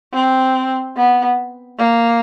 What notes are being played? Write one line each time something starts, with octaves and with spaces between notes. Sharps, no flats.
C4
B3
A#3